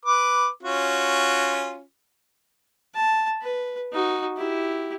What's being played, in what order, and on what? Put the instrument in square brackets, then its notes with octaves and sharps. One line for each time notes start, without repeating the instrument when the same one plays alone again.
[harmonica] B4 D6
C#4 F4 F#4
[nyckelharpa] A5
B4
D#4 F#4
E4 G4